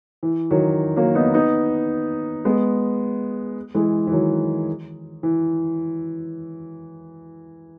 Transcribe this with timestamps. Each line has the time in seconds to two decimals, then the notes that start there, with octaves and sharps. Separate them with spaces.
0.23 E3
0.51 D#3 F#3
0.96 F#3 A#3
1.15 B3 D#4
1.34 B3 D#4
2.45 G#3 B3
3.74 E3 G#3
4.07 E3
4.12 D#3 F#3
5.23 E3